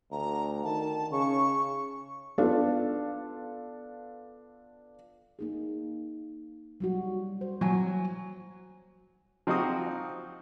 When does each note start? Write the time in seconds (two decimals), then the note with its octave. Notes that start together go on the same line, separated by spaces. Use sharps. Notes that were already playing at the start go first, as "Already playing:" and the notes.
0.12 D2 A#5
0.64 D#3 A5
1.12 C#3 C#6
2.38 B3 D4 F4 A4 F5
5.39 A#3 D#4 G#4
6.80 F#3 G3 F#4
7.41 C5
7.61 F#3 G#5
9.47 F3 C4 D#4 F#4 G4 D#6